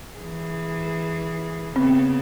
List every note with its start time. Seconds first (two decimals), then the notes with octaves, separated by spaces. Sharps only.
0.17 E3 G#4
1.76 C#3 B3 C4